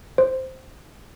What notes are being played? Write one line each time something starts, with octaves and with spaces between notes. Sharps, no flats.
C5